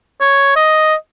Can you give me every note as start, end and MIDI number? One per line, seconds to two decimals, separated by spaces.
0.21 0.54 73
0.56 0.94 75